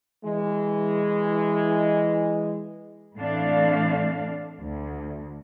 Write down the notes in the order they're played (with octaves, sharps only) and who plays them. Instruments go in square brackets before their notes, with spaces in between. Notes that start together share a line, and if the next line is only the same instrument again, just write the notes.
[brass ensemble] E3 G#3
[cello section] A2 E3 A3 C4 D4 F5
D2